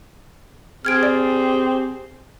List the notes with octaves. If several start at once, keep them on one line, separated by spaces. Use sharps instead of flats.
C4 G4 G#4 F6 G#6 D7
D5